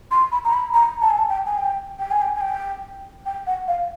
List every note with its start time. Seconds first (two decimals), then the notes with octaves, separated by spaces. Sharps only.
0.11 C6
0.32 B5
0.45 A#5
0.53 B5
0.74 A#5
1.01 A5
1.10 G#5
1.18 A5
1.29 G5
1.46 G#5
1.58 G5
1.99 G5
2.11 G#5
2.22 G5
2.36 G#5
2.41 G5
3.26 G5
3.47 F#5
3.68 F5